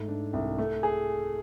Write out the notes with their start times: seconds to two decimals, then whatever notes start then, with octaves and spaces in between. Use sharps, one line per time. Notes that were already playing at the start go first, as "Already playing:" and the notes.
Already playing: G#2 A3
0.08 D4
0.33 C2
0.58 A3
0.83 G#4